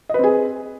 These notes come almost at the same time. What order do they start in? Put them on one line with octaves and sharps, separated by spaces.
D#5 B4 C4 G#4